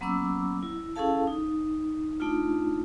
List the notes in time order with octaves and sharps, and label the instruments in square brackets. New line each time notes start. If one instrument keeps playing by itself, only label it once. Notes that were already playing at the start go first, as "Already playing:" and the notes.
[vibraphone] F#3 A#3 B3 C#4 D6 E6
E4
C#4 E4 G#4 A4 F5 A5
D#4
A3 D4 D#4 F4